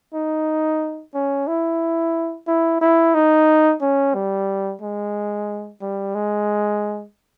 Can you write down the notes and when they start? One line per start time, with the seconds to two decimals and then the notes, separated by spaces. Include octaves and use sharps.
0.14 D#4
1.14 C#4
1.47 E4
2.47 E4
2.81 E4
3.15 D#4
3.81 C#4
4.14 G3
4.82 G#3
5.81 G3
6.15 G#3